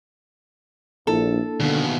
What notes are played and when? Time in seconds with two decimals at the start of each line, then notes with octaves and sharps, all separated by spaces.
1.07 A#1 A#3 D4 E4 A4
1.60 D#2 B2 D3